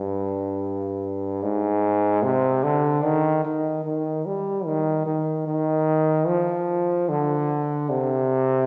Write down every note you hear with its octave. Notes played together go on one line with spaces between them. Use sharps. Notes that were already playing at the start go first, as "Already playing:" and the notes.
Already playing: G2
G#2
C3
D3
D#3
D#3
D#3
G3
D#3
D#3
D#3
F3
D3
C3